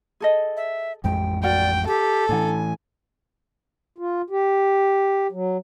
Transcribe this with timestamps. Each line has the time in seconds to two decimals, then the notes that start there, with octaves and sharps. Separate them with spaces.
0.20 G#4 A4 D#5
0.57 E5
1.04 A1 F2 G#3 G5
1.43 F#4 A#4 D5 F#5 G5
1.87 G4 A4
2.29 A2 E3 D4 F#5 G#5
3.98 F4
4.30 G4
5.32 F#3